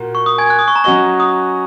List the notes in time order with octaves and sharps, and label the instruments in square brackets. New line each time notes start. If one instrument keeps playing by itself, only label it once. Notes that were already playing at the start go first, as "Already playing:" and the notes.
Already playing: [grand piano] A#2 A#3 F#4
[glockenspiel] C#6
D#6
G#5 G#6
F#6
D#6
C#6
A#5
[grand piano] F#3 C#4 F#4 D#5 [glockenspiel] C#6
[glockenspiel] D#6